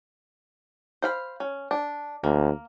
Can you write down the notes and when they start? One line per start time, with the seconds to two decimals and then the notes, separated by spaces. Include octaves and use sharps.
1.02 C5 F5 B5
1.40 C#4
1.71 D4
2.24 D2 A#3